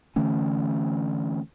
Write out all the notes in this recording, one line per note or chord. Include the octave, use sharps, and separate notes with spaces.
D3 E3 A3 C#4